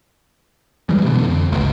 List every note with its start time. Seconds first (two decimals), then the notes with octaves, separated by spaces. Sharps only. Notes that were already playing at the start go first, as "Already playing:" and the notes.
0.89 E3 G3 G#3
1.04 B2 D3 E3 B3
1.22 F2
1.52 G1 C#2